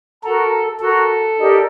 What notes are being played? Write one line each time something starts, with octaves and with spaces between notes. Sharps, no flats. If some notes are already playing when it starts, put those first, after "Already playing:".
F#4 A4 A#4 F#5 A#5
F#4 A4 A#4 F#5 A#5
D#4 G4 A#4 D5